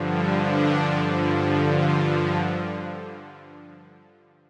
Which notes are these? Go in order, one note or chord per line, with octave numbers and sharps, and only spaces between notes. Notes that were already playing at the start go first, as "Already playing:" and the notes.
Already playing: G2 D3 F3
D4
G2 D3 F3
F4